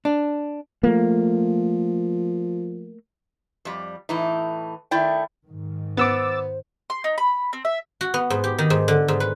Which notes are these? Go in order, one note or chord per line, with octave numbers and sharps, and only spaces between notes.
D4
F3 A3 A#3
F2 G3
A2 E3 D#4
D#3 A3 E4 D5 G5
G#2 D#3
B3 C5 D6 E6 A6
C6
D#4
B5
C4
E5
F#4
B3
G#2
G4
D#3
G#2
D3
G#2
B4